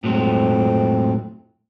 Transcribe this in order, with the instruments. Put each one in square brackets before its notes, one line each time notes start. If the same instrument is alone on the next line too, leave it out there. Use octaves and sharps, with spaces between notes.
[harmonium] F2 C4 [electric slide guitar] A2 F#3 G#3